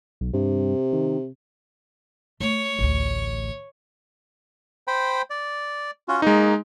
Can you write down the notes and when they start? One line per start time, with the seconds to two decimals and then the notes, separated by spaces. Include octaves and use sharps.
0.21 B1
0.34 G2 C3
0.93 D#3
2.40 A3 C#5
2.79 A1 D2
4.88 C5 G5 B5
5.30 D5
6.08 C#4 F4 F#4
6.22 G#3 A#3 D#4